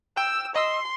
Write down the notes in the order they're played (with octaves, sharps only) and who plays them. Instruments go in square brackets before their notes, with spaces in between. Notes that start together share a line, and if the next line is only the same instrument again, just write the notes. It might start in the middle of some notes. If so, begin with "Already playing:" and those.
[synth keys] G5 [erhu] E6
[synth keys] D#5 E6 [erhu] C6